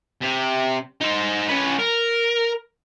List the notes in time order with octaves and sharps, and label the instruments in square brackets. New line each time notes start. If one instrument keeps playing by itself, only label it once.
[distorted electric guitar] C3
D#4 C5
C#4 B4
A#4